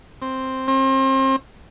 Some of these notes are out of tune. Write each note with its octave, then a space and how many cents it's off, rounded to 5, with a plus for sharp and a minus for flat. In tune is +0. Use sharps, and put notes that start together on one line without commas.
C4 +5
C4 +35